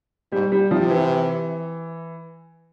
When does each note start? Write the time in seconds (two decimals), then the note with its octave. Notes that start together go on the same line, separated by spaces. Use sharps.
0.32 G#2 G3
0.52 G3
0.71 C3 F3
0.90 E3